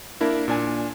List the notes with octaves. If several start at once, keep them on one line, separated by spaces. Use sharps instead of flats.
A#3 D4 E4 A#4
A#2 D4 G#5